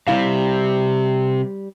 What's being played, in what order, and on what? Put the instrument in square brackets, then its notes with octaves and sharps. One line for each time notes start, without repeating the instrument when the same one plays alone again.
[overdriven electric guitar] C3 [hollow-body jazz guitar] G3 E4 F5